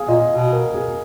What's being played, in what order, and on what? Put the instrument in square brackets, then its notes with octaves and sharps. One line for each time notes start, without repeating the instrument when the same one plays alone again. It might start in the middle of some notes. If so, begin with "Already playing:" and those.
Already playing: [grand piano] G#4 F5
[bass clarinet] A#2 [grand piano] D#5
[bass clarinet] B2
[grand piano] A#4
G#4